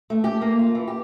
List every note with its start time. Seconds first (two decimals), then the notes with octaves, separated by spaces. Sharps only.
0.10 A3
0.24 G4
0.41 A#3
0.59 F4
0.75 E3
0.87 G4